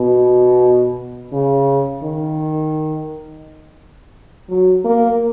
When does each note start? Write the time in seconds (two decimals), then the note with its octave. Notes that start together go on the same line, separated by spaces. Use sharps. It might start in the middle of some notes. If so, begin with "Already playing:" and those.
Already playing: B2
1.33 C#3
2.03 D#3
4.49 F#3
4.85 A#3